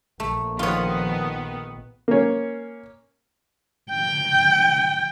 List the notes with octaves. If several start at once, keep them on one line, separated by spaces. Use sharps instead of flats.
A#1 A3
D#3 F3 B3 F4 C#5
A#3 C#4
G5